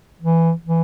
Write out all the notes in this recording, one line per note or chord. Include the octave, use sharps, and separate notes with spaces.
E3
E3